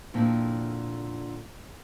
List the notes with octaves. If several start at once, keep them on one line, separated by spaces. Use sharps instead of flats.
F2 A#2 D3 C4 E4